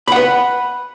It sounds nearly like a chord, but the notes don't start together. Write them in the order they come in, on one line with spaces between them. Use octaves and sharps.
B5 F#5 B4